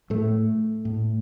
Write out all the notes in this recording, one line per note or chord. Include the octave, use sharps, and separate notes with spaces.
A2 A3
A2